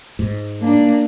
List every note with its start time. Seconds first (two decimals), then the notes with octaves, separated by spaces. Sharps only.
0.19 G#2
0.60 A#3 D4